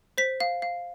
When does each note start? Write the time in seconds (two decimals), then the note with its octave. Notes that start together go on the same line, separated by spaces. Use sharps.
0.18 C5 B6
0.40 F5
0.62 F5